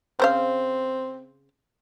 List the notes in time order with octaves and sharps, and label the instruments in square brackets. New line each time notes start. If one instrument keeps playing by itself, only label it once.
[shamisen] C#3 C5 F5 [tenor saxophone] C4